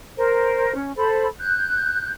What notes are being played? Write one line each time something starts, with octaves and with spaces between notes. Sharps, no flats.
A#4 C5
C#4
A4 C5 B5
F#6 G6